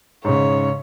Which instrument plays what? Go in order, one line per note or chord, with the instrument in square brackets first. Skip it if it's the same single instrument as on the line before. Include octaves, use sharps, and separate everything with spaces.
[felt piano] G#2 C#3 [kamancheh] C#5